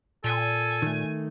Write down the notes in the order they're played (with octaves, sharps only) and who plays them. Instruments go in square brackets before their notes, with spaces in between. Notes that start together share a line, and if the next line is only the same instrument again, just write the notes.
[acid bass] A#2 [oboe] A4 [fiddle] G#5
[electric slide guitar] D#3 A3